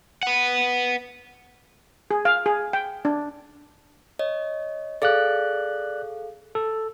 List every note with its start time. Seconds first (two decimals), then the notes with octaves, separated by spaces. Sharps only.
0.23 B4 F#5
2.11 G#4
2.25 F5
2.46 G#4
2.73 G5
3.05 D4
4.19 C#5 D#5
5.02 G#4 A4 D5 F5 F#6
6.55 A4